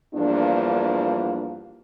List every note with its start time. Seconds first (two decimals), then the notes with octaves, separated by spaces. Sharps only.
0.15 E2 G2 F3 A#3 D4